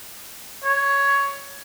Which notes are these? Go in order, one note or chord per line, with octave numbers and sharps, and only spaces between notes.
C#5